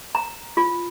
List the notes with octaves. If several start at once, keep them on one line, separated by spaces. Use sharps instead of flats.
A#5
F4